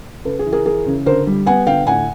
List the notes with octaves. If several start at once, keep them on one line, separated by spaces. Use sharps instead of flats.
C#3 A4 B4
G#4
E3
G#4 A#4
E3 G#4 A#4
C#3
D3 A#4 C5
G3
B3 F#5 G#5
D3 F5 G5
A2 F#5 G#5